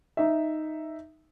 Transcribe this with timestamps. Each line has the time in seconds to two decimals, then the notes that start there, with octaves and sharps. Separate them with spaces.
0.17 D#4 E5